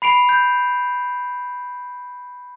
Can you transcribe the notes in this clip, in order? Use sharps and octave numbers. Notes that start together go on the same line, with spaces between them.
B5 C7 D7 F7
G6